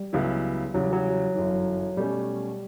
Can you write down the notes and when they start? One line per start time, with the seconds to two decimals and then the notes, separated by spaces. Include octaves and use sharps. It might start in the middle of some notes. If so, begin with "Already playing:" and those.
Already playing: G3
0.13 C#2 C#3 F#3 B3 E4
0.74 E2 C#3 F#3 G3
0.93 F#3
1.35 G1 F#2 E3
1.97 B2 G3 A3 C#4